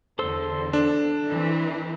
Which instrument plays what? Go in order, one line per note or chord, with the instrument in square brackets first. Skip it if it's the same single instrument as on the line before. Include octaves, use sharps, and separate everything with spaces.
[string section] E2 D3 [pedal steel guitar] A4 C5 E6
[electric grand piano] D4 [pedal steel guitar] A4
[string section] E3 C4